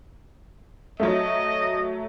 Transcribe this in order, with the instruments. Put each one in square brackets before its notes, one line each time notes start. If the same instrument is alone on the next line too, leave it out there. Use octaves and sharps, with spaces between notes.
[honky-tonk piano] F#3 A3 [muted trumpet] D#5